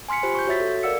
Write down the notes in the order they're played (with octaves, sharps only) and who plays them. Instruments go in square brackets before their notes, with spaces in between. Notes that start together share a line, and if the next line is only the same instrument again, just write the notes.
[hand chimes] G#5 C6 F6 B6 C#7
F4 G4 C5 B5
C#6 G6
F#4 C#5 E5 A6 B6
A4
A#4 D5 F5 F#5 E6 C#7